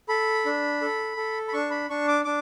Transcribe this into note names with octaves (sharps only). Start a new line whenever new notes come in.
A4 B5
D4
A4
A4
B5
D4 C#6
B5
D4 C#6
D6
D4 D6